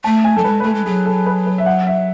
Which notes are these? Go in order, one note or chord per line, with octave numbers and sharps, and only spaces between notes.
A3 A5
G#5
F#3 A4
G#3 B4
B4
A3 A4
G#3
F#3 G#4
A4
B4
B4
E5
F#5
E5